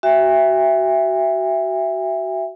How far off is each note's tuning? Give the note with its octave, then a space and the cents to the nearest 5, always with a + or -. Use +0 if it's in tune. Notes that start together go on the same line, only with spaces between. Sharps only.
F#4 +25 E5 +10 G#5 -45